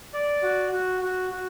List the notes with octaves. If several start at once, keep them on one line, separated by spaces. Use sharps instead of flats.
D5
F#4
F#4
F#4
F#4